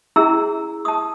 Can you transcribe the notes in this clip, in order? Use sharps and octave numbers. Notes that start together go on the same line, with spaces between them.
C#4 E4 G#4 A#5 E6
A5 D#6